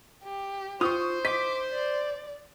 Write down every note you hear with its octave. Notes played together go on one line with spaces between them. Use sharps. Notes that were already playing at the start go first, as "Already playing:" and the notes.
G4
F4 C5 C#6 D#6
D#5 D6 B6
D5